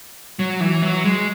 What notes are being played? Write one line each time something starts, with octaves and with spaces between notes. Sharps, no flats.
F#3
E3
F#3
G#3